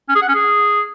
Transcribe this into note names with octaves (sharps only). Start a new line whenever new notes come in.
C#4
G#4
F#5
C#4
G#4